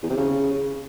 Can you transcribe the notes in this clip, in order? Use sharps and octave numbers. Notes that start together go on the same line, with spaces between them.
E2
C3
C#3